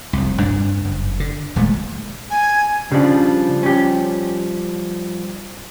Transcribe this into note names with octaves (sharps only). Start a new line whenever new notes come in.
F1 C2
G2 D4
F#1
D3
D#1 A#2 G#3 A3
G#5
C#3 F3 G3 D4
C#4 G4